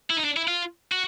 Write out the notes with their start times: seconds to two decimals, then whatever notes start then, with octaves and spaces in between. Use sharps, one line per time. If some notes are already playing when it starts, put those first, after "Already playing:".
0.10 E4
0.17 D#4
0.25 D4
0.37 E4
0.48 F4
0.92 F#4